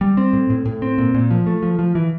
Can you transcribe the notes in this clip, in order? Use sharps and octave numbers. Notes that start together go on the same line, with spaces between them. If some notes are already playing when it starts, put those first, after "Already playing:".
G3
C4
A2
A2
A2
C4
A#2
A#2
F3
A3
F3
F3
E3